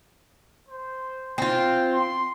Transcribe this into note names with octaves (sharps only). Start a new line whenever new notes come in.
C5
C4 F4 G5
C6